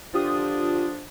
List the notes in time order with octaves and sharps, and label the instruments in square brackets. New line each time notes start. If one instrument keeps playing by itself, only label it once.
[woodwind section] D3 F3 D4 [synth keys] F4 G4 D#6